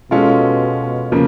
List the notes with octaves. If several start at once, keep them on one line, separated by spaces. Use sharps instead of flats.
B2 G#3 C#4 F4 A4
C#3 F3 A#3